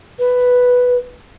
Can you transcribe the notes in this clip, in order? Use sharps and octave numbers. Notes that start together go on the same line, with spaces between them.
B4